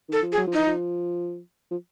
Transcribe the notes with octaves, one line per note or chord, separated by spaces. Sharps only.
D#3 A4
F3
G#4
F#3
F3
E3 D#4
F3
F3